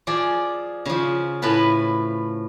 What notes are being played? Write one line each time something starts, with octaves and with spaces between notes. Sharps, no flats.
F3 G#4 D5
C#3 F3
A2 B4 A5 B5